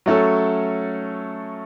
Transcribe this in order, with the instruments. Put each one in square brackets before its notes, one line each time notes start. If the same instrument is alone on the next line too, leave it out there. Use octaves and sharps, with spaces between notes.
[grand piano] F#3 A3 C#4 A4